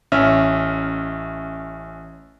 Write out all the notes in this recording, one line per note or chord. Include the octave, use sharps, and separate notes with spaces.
A1 C#4 E5 F6